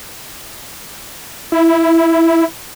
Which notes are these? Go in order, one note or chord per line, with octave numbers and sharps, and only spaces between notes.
E4